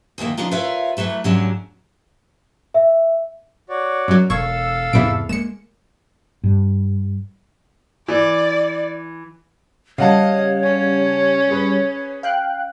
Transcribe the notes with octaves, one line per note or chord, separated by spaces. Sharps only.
D2 D#3 A3 A#3
C#3 F3 D4 D#4 F4
F4 A#4 B4 C#5 E5 F5
E3 F#3 A3 B4
D#2 G#2 F#3 A3 C#4 D4
E5
F#4 C#5 D5
F#2 F#3
E1 A4 F5 C#6 E6 G#6
E2 G#2 C3 E3 D7
G#3 A#3 C#7 E7
G2
E3 D5
C#3 G3 C#5 D#5 F5 F#5 A5
C#4
G#4 B4
F5 G5 F#6